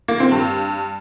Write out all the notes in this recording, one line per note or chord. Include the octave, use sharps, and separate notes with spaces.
A#3
C4
G2